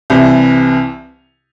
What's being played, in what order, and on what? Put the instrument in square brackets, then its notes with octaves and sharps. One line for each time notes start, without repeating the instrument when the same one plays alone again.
[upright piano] C2 C3 E3